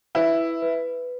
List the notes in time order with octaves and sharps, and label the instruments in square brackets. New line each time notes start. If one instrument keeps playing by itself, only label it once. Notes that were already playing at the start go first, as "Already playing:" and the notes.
[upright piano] E4 [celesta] B4
[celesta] B4